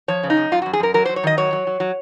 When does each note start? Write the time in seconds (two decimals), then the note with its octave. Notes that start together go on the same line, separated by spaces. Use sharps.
0.08 F3 C#5
0.23 C#3
0.30 D#4
0.37 F#2
0.52 F#2 F4
0.62 F#2 F#4
0.73 G#4
0.80 F#2 A#4
0.94 F#3 A#4
1.05 F#3 C5
1.16 C#5
1.23 D#3 D#5
1.37 F#3 C#5
1.53 F#3
1.67 F#3
1.80 F#3